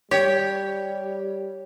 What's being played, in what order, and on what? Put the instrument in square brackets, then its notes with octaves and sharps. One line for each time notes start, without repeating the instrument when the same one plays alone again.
[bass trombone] G3 [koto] G4 [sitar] C#5